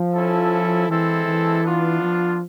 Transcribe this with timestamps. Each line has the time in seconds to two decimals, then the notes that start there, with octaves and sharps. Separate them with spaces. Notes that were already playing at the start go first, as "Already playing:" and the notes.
Already playing: F3
0.12 C#4 E4 A4
0.88 E3 G#3 C4 E4 A4
1.26 E3
1.63 B3 D4 F4
2.00 F3